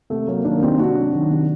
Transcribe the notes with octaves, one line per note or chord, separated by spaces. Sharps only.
C3 A3
F#3 A#3
D#3 A#3 D4
C3 C4 D#4
C3 D4 F#4
F#3
D#3
C3